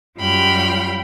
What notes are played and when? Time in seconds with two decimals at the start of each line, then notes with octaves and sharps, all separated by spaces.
0.18 F#2 G3 F4 G5 B5 F6